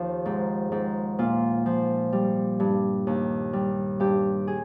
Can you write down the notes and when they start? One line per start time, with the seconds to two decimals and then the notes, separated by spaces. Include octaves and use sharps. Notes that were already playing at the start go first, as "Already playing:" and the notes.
Already playing: D#2 F3 G4
0.26 G#2
0.72 G#2
1.19 A#2 F4
1.66 F3
2.13 G3
2.60 G2
3.07 D#2
3.53 G3
4.00 G2 G4
4.47 G#4